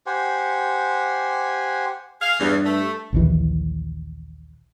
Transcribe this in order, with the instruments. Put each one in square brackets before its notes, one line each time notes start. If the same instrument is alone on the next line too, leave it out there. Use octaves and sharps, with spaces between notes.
[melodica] G4 C5 F#5 G#5
[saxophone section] G#4 F5
[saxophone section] E2 [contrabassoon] G2
[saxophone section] A3
[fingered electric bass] A#1 D#2 E3